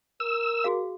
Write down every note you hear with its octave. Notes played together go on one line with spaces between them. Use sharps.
A#4 E6
F#4 G#4 F5